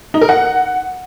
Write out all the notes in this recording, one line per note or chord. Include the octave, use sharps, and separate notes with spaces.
D#4
A#4
F#5